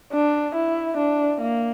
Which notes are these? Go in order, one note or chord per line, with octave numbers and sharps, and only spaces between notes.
D4
E4
D4
A#3